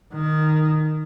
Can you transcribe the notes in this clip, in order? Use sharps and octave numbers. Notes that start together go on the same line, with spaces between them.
D#3